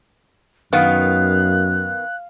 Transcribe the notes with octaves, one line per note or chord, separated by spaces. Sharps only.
F#2 D#3 B3 F5 F#6